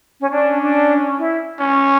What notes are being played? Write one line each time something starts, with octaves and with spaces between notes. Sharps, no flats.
C#4
C#4 D4
D4
E4
C#4